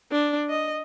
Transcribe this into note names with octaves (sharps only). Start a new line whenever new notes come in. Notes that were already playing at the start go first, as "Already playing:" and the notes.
D4
D#5